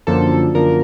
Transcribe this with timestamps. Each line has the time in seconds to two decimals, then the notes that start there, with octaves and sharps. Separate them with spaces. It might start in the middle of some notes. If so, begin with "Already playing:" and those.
0.07 F#2 D3 F3 A#3 A4
0.54 F#2 D3 F3 A#3 A#4